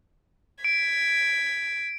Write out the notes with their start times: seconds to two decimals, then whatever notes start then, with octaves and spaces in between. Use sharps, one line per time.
0.64 G#6 B6 D7